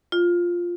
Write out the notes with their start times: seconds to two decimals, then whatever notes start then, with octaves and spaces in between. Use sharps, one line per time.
0.12 F4